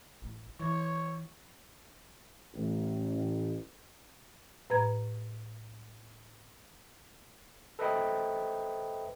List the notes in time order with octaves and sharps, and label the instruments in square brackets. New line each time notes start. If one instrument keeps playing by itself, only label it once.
[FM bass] A1
[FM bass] E3 [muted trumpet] C#5
[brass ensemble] A1
[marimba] A2 B4 A#5 G#6
[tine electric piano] A4 B4 C5 D#5 E5 G5